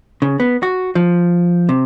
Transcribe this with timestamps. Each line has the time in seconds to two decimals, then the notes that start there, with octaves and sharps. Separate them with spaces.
0.22 C#3
0.40 B3
0.63 F#4
0.95 F3
1.69 C3